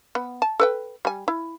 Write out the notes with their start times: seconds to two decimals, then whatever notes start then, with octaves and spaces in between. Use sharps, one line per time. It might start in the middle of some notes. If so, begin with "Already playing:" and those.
0.15 B3
0.42 A5
0.60 A4 B4 G5
1.05 G3 G#5
1.28 E4